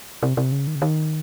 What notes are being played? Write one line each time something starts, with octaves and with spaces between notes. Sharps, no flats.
C3
C3
C#3
D#3
C#3
D#3